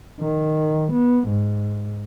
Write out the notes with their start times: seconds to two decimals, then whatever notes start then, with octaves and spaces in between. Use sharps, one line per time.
0.21 D#3
0.92 B3
1.28 G#2